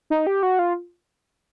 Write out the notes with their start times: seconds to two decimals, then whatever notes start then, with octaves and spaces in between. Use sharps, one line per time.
0.10 D#4
0.27 G4
0.43 F#4
0.59 F4